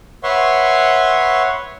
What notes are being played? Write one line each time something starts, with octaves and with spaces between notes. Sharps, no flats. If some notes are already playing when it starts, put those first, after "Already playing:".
B4 C#5 E5 F#5 C6 C#6